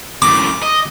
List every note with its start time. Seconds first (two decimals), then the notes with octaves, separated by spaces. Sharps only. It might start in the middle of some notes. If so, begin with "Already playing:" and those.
0.22 F#2 A2 D6
0.62 D#5